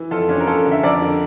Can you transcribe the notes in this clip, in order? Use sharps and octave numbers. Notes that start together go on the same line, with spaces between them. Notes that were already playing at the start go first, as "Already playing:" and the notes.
Already playing: E3
F2 F4 A4
C#4 D4 F4
A#4
C#4 F4 A4
D3
E5
F2 A#4 D5
D3